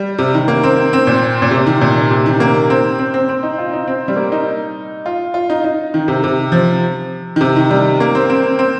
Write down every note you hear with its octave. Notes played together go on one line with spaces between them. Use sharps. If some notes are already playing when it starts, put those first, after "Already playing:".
Already playing: G3
C3
D#3
A#3
C4
C4
A#2
A#2
C3
D#3
A#2
C3
D#3
A#3
C4
C4
C4
C4
D#4
F4
D#4
C4
G3
A#3
D#4
F4
F4
D#4
D#4
D#3
C3
C3
F3
D#3
C3
D#3
G3
A#3
C4
C4
C4